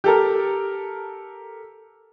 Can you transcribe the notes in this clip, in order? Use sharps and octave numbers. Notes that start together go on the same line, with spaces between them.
G4 A4 A#4